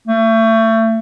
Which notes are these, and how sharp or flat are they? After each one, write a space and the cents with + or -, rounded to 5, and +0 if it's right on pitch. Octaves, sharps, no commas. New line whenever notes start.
A3 +30